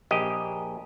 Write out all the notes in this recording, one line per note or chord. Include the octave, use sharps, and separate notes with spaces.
A#1 G4 D#5